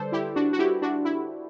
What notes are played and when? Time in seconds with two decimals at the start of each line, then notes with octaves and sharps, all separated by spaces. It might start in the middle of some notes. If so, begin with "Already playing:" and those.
Already playing: D3 G3 A4 B4 C5 D5
0.12 E4 G4
0.35 D4 F#4
0.53 F#4
0.59 E4 G4
0.82 D4 F#4
1.05 E4